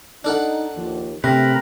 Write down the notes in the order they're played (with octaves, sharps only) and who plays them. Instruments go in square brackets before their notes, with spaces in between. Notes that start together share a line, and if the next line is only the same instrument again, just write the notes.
[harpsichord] D4 A4 F#5 [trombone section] D#4
[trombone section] D#2 F3
[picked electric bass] C3 [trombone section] A3 D4 [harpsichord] C4 [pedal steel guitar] A#4 B4